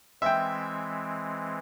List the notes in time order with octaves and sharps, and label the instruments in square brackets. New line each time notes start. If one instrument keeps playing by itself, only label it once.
[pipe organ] E3 G#3 C4 [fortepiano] E5 G5